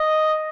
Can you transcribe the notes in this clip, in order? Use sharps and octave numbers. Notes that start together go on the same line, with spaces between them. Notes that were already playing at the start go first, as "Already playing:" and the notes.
Already playing: D#5